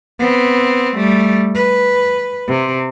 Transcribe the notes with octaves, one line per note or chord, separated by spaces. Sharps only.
B3 C4
G3 A3
B4
C3